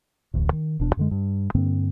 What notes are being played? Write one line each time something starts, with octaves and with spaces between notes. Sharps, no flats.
D1 A1 D2 A2
D#3
E1 B2 D4
F#2 D3 G#3
G2
G2 D3 A#3 C4